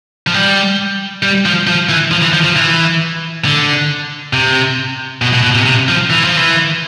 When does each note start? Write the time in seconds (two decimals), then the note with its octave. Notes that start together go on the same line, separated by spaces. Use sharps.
0.27 F3
0.34 G3
1.22 G3
1.45 F3
1.67 F3
1.89 E3
2.11 F3
2.22 E3
2.33 F3
2.44 F3
2.56 E3
3.45 D3
4.33 C3
5.22 B2
5.33 B2
5.43 B2
5.55 C3
5.66 C3
5.88 F3
6.10 E3
6.24 F3
6.37 E3